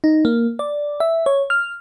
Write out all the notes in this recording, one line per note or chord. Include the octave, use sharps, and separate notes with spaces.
D#4
A#3
D5
E5
C#5
F6